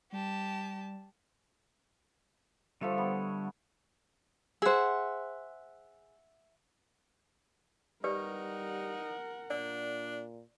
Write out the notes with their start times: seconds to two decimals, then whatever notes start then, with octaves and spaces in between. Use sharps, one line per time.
0.12 G3 G4 A5
2.81 D3 F3 G3 A3 C#5 E5
2.98 B3
4.62 G#4 C5 E5 F#5
8.04 G3 D#4 G4 A#4 B4 D5 F#5
9.50 A#2 D4 D5